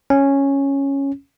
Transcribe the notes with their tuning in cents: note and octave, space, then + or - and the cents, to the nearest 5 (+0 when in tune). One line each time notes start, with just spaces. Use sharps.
C#4 -5